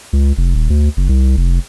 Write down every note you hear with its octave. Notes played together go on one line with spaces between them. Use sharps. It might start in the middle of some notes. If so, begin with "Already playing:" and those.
C#2
F1
D#1
D2
F#1
C2
F1